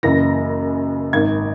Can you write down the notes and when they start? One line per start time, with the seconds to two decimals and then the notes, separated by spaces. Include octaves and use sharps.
0.03 F#1 F#2 C#3 E3 A#6
1.13 G#1 G#2 D#3 G#6